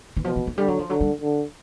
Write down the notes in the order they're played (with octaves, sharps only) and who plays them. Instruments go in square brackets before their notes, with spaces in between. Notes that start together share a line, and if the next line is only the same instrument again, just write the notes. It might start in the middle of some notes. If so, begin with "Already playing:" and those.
[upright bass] E3
[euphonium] B2 [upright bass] F3
[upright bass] E3
F3
[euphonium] D3 [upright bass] G3
[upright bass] F#3
F3
[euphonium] D3 [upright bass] F#3
[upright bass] G3
[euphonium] D3